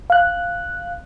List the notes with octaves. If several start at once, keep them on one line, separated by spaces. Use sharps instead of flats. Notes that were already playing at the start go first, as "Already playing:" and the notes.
F5 F#6